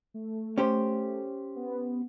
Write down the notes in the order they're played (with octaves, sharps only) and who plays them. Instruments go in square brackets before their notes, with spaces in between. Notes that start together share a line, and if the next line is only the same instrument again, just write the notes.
[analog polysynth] A3
[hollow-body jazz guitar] C#4 G4 C5
[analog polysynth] B3